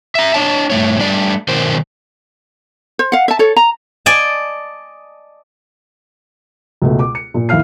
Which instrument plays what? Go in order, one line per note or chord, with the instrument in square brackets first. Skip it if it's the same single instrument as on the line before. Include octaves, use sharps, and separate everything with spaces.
[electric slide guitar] E5 A#5
D4 C#5 A5
G2 D#3 A3 C#5
G3 A3 D4 D5
B2 D#3 A#4 C5
[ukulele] C5
F5 F#5
E5 A5
A4 C#5
A#5
[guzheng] D5 D#5 G#5 A5
[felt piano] C#2 B2 A3
D6
C#7
A#2
D#2 E4 F5 F6 C7